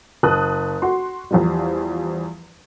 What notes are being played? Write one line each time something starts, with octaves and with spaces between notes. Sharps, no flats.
F#1 A5 D#6 F#6
F#4 C6
E2 F3 G3